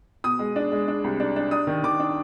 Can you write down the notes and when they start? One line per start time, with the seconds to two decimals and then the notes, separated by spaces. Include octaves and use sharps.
0.24 B2 D#6
0.39 G#3
0.56 D4
0.72 G#3
0.88 D4
1.04 C2
1.20 D4
1.36 D4
1.51 D4 D#6
1.67 D#3
1.83 D#3 D6
2.00 D4